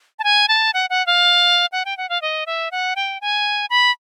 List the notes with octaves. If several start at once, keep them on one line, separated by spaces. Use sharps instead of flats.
A5
G#5
A5
F#5
F#5
F5
F#5
G5
F#5
F5
D#5
E5
F#5
G5
G#5
B5